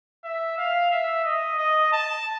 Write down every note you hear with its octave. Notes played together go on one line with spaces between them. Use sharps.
E5
F5
E5
D#5
D#5
A5